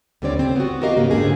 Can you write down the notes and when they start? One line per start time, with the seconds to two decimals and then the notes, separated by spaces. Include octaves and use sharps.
0.22 D2 D3 G3 C4 C#5 D5
0.39 C#3 C4
0.56 B3 F#4
0.82 F#4 G4 A#4 D#5 F5
0.97 G#2 C#3 A#3
1.11 G#2 D3 G4 G#4